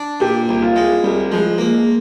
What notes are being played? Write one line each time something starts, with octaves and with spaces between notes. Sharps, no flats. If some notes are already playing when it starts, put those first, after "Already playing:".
Already playing: D4
A#2 G4
C2
F4
G#3
C2 G3
F3 G#3
G#3 A#3